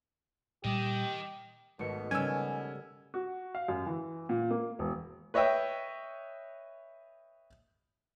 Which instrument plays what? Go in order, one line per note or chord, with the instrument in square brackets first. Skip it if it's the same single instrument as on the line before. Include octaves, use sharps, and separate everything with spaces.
[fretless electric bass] A#2 G3 [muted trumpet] G4 [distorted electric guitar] D#5 G5
[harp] G#1 A3 C#7 [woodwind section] B2
[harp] C#3 G3 [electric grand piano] C#4 E6 [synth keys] G#5
[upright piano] F#4
F5
F#2
E3
A#2
A#3
E1
[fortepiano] B4 C#5 D#5 E5 G5